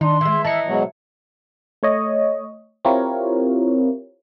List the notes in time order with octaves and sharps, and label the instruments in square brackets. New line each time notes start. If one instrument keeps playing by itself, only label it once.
[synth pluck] D#3 [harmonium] D4 [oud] D#4 [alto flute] C6
[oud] E3 G#3 [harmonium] E5
[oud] E3 [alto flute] D#5 [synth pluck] A5 A#5 C#7
[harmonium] G#2 B2 F#3
[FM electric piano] A3 C#5 D#5
C4 E4 F4 G4 A#4 C#5